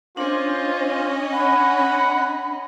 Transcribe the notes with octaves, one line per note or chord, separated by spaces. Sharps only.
C#4 D4 F4 C5 D#5
F#5 B5